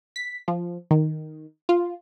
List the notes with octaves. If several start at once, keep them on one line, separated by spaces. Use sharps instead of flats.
B6
F3
D#3
F4